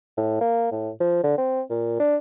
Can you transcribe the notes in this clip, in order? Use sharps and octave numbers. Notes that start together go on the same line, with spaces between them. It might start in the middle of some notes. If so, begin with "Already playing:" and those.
A2
A#3
A2
F3
D3
C4
A#2
D4